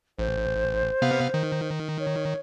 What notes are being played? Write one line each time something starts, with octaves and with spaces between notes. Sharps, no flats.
A1 C5
C3 B3 F5
D#3
C#5